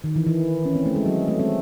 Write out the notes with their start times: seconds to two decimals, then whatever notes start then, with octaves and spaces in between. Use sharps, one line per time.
0.04 D#3
0.16 E3
0.27 E3
0.65 C#4
0.76 C4
0.86 A3
0.96 G#3
1.06 F#3
1.28 A3
1.40 G#3 C4